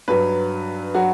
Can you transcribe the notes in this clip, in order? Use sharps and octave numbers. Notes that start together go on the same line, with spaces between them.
G2 F#3 B4
F#3 F#4